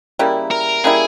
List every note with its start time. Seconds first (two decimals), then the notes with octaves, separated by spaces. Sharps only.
0.19 C#3 G3 A#3 E4
0.51 A#4
0.84 C#3 G3 A#3 E4 G#4